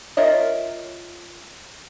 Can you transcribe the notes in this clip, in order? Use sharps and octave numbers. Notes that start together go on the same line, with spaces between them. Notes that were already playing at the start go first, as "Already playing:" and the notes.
F4 A#4 C#5 D#5 E5